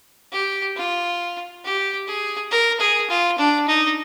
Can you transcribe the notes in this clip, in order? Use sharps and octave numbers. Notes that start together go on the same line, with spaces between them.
G4
F4
G4
G#4
A#4
G#4
F4
D4
D#4